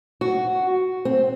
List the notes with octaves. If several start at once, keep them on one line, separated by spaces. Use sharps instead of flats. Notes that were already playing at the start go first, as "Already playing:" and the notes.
F#4
C4